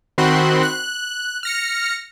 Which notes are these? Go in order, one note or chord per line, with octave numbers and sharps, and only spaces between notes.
D#3 C4 F#4 B5 C6 F#6
F#6
F6 A#6 C#7